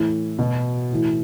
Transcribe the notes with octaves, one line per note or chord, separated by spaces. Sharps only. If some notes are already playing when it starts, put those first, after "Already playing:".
Already playing: A2 E3
B2
A2 E3